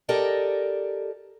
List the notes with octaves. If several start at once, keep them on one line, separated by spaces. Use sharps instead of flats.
G4 A4 A#4 D5 D#5